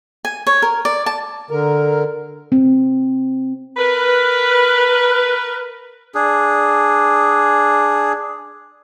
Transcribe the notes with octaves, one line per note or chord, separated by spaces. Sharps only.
G#5
C#5
A#4
D5
A5
D3 A#4
C4
A#4 B4
D4 G#4